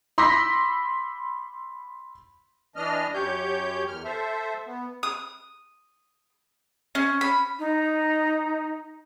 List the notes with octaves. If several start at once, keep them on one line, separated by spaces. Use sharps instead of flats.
B5 C6 D6 E6 A#6 B6
E3 D4 D#5 F6
F#2 G4 C#5 G6
E2 F6
A4 C5 E5
B3
D#6
C#4
B5
D#4